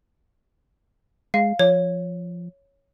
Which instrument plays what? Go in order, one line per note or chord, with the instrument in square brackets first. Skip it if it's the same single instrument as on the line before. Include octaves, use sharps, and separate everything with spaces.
[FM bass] G#3 [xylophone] F5
[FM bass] F3 [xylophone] C#5